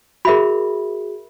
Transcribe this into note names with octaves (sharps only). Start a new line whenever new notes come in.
F#4 G#4 A#4 E5 B5